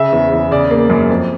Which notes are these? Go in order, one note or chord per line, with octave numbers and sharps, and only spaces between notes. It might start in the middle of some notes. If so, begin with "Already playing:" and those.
Already playing: C#3 E5
E2
E2
C#3 D5
A#3
F#2
F2